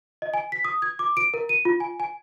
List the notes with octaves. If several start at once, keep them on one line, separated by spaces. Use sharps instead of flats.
D#5
G#5
B6
D#6
G#6
D6
D7
A#4
D#7
F4
G#5
G#5